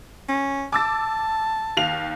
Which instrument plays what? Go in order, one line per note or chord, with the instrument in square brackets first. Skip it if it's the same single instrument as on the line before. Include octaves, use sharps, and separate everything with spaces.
[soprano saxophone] C#4
[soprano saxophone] A5 [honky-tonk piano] D6 E6 A6
[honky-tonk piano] D#2 F5 F7